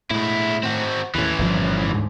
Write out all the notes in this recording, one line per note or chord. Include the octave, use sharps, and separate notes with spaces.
A2 G#3 E4
C4 F#4
D#2 A2 E3 C#4
G1 A#2 F3
D2 G#2